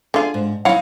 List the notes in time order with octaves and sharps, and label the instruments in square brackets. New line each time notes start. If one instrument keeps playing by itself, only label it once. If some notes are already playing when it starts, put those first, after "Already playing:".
[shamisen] D3 F4 [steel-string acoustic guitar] G#4 D5 G#5
[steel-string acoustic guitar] G#2
[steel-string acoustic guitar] F#3 D#4 [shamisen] E4 C#5 F#5 [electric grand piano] F5